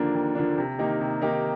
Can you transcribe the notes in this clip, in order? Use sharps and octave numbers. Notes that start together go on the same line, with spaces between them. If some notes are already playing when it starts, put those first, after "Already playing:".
Already playing: D#2 D3 F3 A#3 D4
D#2
D3 F3 A#3 D4
C3
D#3 A#3 D#4 G4
C3
D#3 A#3 D#4 G4